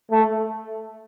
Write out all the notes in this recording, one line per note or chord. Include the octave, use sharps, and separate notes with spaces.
A3